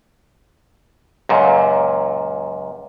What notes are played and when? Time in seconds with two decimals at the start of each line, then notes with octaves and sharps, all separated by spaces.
1.29 C#2 F#2 A#2